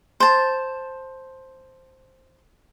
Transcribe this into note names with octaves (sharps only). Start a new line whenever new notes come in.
C5 A5